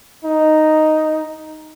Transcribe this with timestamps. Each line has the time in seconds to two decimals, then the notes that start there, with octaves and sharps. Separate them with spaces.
0.25 D#4